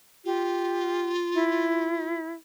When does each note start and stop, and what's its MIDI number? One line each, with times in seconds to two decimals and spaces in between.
0.25 2.18 65
0.25 1.11 67
1.34 2.32 64